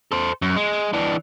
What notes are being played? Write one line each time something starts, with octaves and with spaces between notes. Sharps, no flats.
A4 C5
F#2
G#3
E3 D4